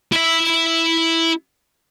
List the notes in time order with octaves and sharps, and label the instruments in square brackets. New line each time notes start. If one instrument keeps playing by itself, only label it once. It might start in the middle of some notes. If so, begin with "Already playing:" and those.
[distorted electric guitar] E4 E5